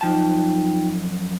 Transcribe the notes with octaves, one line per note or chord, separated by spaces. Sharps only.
F#2 F3 D#4 F4 G5 A5